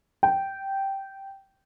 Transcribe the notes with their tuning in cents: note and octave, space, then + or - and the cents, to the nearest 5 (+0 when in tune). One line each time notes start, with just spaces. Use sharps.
G5 -10